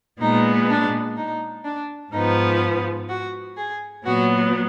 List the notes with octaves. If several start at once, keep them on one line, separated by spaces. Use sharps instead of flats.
A#2 G#3 B3 D#4
D4
D#4
D4
G#2 F3 B3 D#4
F#4
G#4
A#2 F#3 B3 F#4